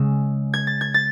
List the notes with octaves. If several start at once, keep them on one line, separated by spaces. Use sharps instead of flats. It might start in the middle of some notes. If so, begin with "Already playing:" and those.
Already playing: C#3 G#3 E6
G#6
A6
G#6
A6